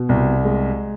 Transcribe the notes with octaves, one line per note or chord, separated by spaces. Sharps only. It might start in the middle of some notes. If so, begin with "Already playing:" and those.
Already playing: B2
C2
G#3